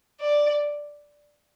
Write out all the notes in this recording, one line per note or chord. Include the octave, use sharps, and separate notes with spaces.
D5